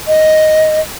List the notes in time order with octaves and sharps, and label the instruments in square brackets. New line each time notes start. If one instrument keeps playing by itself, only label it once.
[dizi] D#5